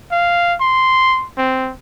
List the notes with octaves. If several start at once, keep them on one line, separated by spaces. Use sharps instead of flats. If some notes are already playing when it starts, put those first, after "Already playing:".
F5
C6
C4